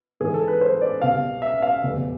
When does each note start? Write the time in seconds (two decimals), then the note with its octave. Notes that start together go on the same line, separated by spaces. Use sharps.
0.20 G#1 G#2 E3 G#4
0.34 A4
0.48 B4
0.61 C5
0.82 D5
1.01 C2 B2 F5
1.42 E5
1.62 F5
1.83 F1 E2 B2